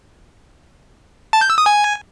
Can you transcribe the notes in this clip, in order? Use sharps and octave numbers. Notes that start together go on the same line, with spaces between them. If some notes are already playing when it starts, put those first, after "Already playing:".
A5
G6
E6
D#6
G#5